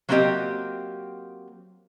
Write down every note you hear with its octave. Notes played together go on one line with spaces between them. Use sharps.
F#3 A#3 C4 F4 G4 D#5